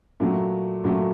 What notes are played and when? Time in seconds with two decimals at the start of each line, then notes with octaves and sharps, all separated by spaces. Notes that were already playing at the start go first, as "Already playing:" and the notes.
0.20 A#2 F#3 A3
0.84 A#2 F#3 A3